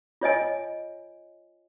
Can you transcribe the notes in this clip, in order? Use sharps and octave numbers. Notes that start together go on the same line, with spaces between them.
F4 C#5 D#5 G#5